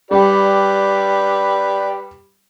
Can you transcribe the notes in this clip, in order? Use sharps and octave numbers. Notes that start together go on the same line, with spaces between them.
G3 G4 B4 D5